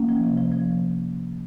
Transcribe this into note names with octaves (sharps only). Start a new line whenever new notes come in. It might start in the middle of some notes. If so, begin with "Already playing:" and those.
Already playing: A#3 C#4
F3
C3
F3
F3